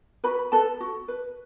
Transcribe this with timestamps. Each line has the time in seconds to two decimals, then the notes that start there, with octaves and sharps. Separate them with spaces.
0.24 F#4 B4 B5
0.52 A4 B4 A5
0.80 F#4
1.08 B4